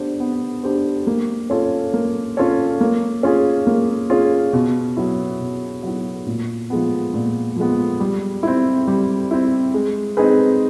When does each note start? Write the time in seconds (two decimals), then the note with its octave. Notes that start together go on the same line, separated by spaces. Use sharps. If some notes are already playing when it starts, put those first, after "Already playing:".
Already playing: B3 D4 G4 C5
0.20 B3
0.64 D4 G4 C5
1.07 A#3
1.50 C#4 F4 A4 C#5
1.94 A#3
2.37 C#4 F4 A4 C#5
2.81 A#3
3.23 C#4 F4 G#4
3.67 A#3
4.10 C#4 F4 G#4
4.53 B2
4.97 F#3 B3 E4
5.40 B2
5.83 F#3 B3 E4
6.26 A#2
6.70 F3 G#3 B3
7.14 A#2
7.56 F3 G#3 B3
8.00 G3
8.43 C4 E4
8.87 G3
9.31 C4 E4
9.74 G#3
10.17 C4 D#4 G#4 B4